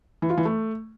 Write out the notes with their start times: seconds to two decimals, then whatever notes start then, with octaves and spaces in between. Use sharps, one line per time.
0.22 E3
0.30 F4
0.38 E3
0.45 A3